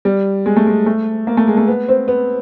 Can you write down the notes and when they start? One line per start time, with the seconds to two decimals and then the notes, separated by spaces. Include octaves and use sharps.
0.05 G3
0.46 G#3
0.56 A3
0.67 G#3
0.86 A3
1.27 A#3
1.37 A3
1.48 G#3
1.57 A3
1.67 B3
1.89 C4
2.08 B3